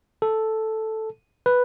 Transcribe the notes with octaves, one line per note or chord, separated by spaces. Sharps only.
A4
B4